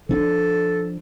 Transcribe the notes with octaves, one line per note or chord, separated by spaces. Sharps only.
F3 C#4 D4 A4